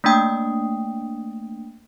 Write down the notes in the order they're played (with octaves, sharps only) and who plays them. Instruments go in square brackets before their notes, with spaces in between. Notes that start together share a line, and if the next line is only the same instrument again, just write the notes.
[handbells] A3 A#3 D4 G5 D#6